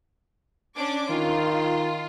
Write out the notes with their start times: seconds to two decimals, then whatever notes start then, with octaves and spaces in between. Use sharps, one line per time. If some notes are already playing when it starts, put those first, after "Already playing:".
0.76 C#4 D4 D6
1.10 D#3 F4